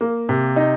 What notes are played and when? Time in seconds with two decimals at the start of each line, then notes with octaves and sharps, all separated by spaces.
0.01 A#3
0.29 C3
0.56 D#4